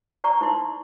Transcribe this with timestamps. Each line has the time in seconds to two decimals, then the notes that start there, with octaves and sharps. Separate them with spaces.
0.24 D5 A#5 C#6
0.41 D#4 E4 C6